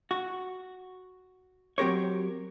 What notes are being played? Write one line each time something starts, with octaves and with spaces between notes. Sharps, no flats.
F#4
F#3 C4 G4 A#4 C#5